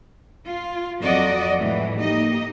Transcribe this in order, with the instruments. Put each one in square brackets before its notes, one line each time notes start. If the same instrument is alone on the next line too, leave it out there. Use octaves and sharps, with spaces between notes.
[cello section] F4
F2 F#3 F#4 D5 D#5
A2 E3 G#3
A#3 D#4 G4 D#5